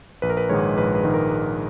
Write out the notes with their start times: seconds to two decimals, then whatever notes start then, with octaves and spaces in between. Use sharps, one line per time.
0.22 A#1 B4
0.30 A#4
0.37 B4
0.49 G#2 D#3 G#3 C#5
0.76 A#1 B4
0.95 B4
1.04 G#2 D#3 G#3
1.14 A#4